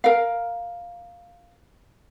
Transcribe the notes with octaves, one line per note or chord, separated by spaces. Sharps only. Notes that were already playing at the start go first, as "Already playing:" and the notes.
A#4 F5